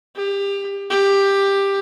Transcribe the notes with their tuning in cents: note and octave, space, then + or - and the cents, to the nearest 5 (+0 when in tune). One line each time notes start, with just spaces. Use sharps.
G4 +25
G4 +10